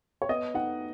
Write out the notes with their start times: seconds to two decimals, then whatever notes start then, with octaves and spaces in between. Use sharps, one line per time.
0.22 C#5
0.29 B3 D#5
0.54 D#4 F#5